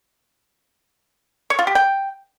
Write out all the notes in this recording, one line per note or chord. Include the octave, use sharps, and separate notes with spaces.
C#5
F4
G4
G5